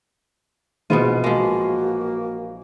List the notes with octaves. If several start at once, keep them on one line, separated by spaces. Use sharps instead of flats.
A#1 G#2 B2 E3 B3 F4 D#7
F3 G#3 A#3 F#4